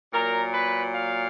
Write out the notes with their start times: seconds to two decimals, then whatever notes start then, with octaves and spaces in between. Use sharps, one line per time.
0.12 A#2 F#3 A#4
0.52 B4
0.94 F5